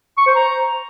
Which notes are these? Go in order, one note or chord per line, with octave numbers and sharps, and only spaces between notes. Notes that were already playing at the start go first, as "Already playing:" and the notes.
C#6
C5
A#5